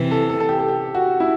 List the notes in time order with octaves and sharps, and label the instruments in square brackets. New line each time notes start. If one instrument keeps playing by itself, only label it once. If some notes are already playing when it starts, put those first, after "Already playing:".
Already playing: [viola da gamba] C3 E3
[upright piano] A4
A4
A4
G4
A4
G4
F#4
E4